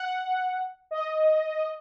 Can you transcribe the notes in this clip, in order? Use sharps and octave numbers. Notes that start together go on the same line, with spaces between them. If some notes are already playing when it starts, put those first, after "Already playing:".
Already playing: F#5
D#5